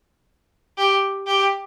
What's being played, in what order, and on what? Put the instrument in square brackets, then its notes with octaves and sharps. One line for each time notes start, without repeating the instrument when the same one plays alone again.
[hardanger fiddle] G4
G4